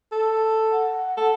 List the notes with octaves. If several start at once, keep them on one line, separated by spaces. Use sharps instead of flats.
A4
F#5
A4